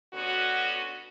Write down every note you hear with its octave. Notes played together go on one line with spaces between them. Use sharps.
D3 B3 C#4 F#4